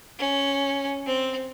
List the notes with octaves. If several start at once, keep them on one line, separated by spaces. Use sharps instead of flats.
C#4
C4